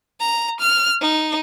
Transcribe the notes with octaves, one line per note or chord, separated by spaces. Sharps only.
A#5
F6
D#4